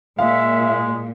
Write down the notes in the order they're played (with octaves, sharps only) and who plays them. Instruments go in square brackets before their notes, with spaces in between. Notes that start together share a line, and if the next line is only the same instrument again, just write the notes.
[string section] A#2 [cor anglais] G#3 [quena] E5 [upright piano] F5